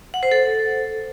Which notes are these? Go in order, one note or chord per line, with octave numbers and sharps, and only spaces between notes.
F#5
C5
A4